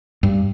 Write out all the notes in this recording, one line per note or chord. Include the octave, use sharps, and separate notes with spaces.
G2